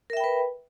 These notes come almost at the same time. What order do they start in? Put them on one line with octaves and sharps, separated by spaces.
A#4 E5 G5 B5 B4